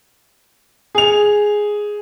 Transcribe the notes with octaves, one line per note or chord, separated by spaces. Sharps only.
G#4 F7